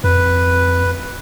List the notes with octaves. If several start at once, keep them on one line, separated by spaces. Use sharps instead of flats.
F2 B4